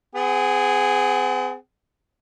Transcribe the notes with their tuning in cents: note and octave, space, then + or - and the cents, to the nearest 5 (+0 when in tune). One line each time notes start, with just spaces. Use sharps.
C4 -45 G#4 -5 F#5 +20